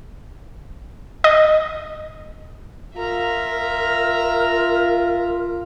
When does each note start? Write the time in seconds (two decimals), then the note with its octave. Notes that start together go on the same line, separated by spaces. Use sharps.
1.24 D#5
2.97 F4 A#4 E5 A#5